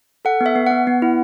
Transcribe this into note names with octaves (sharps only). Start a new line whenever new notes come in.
A4 F#5
B3
E5
B3
B3 F#5
B3
E4